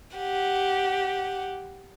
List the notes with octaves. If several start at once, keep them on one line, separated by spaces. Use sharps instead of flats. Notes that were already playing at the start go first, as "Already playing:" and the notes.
G4 F#5